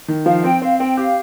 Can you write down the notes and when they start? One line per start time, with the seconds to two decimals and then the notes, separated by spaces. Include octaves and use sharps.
0.08 D#3
0.26 F3 F5
0.44 C4 G5
0.62 C4 F5
0.79 C4 G5
0.97 G4 F5